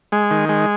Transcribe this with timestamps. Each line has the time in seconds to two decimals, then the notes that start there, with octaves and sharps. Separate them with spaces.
0.12 G#3
0.31 D#3
0.49 G#3